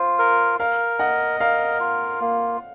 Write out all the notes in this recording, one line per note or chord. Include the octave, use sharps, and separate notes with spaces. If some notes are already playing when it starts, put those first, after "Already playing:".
Already playing: F4 C5
A#4
A#4 F5
D#5 F#5
A#4 F5
F4
A#3